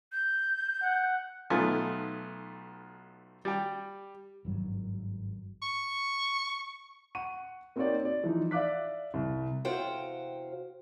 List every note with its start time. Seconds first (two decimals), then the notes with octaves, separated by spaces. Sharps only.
0.12 G6
0.83 F#5
1.50 B1 A3 B3 D#4 F4 G#5
3.45 G3 G5
4.45 G#1 G2 F#3
5.62 C#6
7.15 F#5 C#6 D#7
7.76 A#3 C4 D#4 F#4 C#5 D5
8.05 D5
8.24 E3 F3 D#4
8.51 D5 E5 F5 D6 F#6 B6
9.14 C2
9.65 E2 C3 F#4 C5 F5 G5